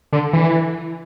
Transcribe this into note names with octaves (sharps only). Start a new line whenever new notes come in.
D3
E3